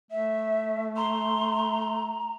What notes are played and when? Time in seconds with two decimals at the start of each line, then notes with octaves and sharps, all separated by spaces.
0.11 A3 E5
0.97 A#5 C6